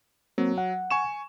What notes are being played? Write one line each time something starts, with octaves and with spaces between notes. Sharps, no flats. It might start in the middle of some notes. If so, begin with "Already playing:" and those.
F#3 A#3 C4
F#5
G#5 C#6 E7